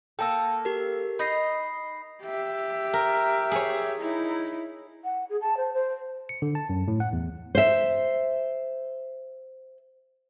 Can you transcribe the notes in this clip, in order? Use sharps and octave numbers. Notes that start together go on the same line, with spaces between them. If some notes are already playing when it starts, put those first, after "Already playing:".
A#3 A4 G5 A5 E6
G4 A#4
D#4 D#5 B5 A#6 C7
G4 E5
A#4
G#4 C#5
D#4 E4
F#5
G#4
A5
C5
C5
C#7
D3
A5
F#2
A2
F#5
E2
C5 E5